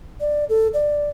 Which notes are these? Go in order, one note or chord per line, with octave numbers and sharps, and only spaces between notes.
D5
A4
D5